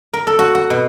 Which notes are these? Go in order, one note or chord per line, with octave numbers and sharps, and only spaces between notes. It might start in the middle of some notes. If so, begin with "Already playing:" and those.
A#4
A4
F#4
F#4
B2